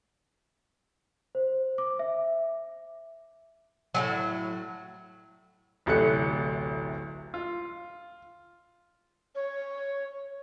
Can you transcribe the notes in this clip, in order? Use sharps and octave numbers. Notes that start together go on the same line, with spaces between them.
C5
D6
E5
A2 D3 F#3
D1 A1 C3 A3 F#6 C#7
F4
C#5